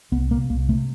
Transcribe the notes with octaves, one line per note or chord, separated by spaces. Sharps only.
C2 B3
C3 A#3
C2 A#3
C3 A3